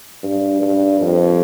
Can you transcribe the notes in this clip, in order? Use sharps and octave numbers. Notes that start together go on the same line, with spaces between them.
G2
G2
F2